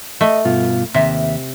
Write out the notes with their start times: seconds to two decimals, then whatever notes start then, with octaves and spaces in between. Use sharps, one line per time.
0.21 A3 D#5
0.45 G2 B2 F4
0.94 D#2 C3 E5